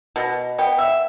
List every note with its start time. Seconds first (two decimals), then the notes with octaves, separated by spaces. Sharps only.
0.16 B2
0.59 B3 G5
0.79 E5